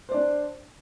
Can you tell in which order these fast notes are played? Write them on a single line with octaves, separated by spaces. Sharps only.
C5 D5 D4